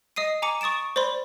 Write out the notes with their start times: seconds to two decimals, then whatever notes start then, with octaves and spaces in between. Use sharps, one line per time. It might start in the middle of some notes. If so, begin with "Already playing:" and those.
0.16 D#5 D#6 C7 D#7
0.42 G#5 A#5 D6 C#7
0.61 C#6 D#6 A6 D7 E7
0.96 C5 D5 B5 C6